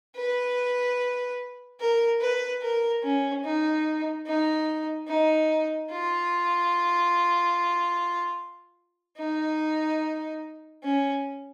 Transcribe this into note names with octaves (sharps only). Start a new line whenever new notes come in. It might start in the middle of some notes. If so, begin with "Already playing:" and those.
B4
A#4
B4
A#4
C#4
D#4
D#4
D#4
F4
D#4
C#4